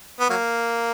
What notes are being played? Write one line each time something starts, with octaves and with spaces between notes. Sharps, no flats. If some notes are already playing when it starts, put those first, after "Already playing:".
B3
F#3 A#3